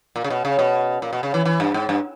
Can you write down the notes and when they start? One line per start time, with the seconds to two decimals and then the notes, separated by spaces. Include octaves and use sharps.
0.16 A#2
0.24 C#3
0.30 B2
0.45 C#3
0.59 B2
1.02 A#2
1.13 B2
1.23 C#3
1.34 E3
1.45 E3
1.60 G2
1.74 G#2
1.89 G2